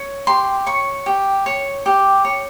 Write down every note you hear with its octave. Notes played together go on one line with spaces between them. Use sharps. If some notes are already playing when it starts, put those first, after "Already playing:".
Already playing: C#5
G4 C6
C#5 C#6
G4
C#5
G4
C#5